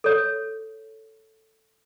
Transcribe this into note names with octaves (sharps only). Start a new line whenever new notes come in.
A4 C#5